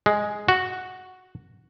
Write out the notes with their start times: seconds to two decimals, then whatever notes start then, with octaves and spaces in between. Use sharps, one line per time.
0.06 G#3
0.48 F#4